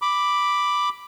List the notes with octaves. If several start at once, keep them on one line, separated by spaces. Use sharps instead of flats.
B5 D6